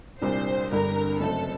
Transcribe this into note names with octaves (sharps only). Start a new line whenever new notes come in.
C2 A#2 G3 D4 C5
G1 G2 D3 G3 A#4
F#1 F#2 F#3 A3 C4 A4